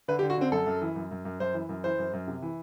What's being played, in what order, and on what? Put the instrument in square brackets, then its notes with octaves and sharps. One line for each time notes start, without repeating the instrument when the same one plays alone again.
[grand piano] D3 B4
G4
D3
F#4
D3 C4
F#2 A4
F#2
E3
F#2
F#2
F#2
F#2 C5
E3
F#2
E3 C5
F#2
F#2
C3
E3